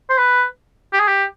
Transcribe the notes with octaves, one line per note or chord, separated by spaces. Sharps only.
C5
B4
G4
G#4
G4